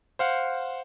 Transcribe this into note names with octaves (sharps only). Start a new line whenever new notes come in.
C5 F5 F#5